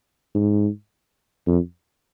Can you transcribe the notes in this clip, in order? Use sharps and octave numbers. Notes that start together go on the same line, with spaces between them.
G#2
F2